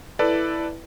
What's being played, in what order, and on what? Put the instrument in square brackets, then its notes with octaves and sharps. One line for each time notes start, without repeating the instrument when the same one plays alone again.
[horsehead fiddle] E4 [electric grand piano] A4 B4 D5